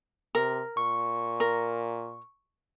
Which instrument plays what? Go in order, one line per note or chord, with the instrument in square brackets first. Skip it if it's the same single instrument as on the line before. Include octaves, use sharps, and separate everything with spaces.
[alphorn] C3 [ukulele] A#4
[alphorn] A#2 [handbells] C#6
[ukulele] A#4